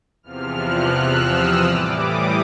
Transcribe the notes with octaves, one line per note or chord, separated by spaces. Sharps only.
E2 C3 F3 F6
F#6
E6
D#6
A2 E3 G3 D6
D#6